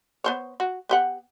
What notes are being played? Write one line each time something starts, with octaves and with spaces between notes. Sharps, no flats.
B3 C5 C#5
F#4
B3 G4 F#5